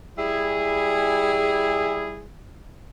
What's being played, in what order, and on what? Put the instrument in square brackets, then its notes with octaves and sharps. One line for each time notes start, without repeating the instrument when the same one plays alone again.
[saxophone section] G3 E4 G#4